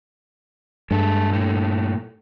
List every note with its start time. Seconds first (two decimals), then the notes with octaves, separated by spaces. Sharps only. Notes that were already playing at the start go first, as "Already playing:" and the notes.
0.91 G2 G#3 A4
1.30 A#2 A3